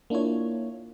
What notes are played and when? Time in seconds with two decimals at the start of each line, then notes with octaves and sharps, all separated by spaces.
0.10 A#3 D4 E4 F4 C#5